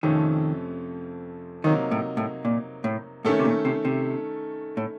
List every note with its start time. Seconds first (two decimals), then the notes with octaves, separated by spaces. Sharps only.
0.03 F2 C3 D#3 F3 A3 C#4
1.64 C3 D#3 F#3 A#3 D#4
1.91 A2
2.17 A2
2.45 A#2
2.84 A2
3.25 A2 D#3 A3 C#4 A4
3.39 C3
3.45 A#2
3.65 C3
3.85 C3
4.77 A2